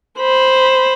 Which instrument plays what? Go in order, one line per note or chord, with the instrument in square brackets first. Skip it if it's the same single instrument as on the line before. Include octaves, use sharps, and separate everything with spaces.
[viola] C5 B5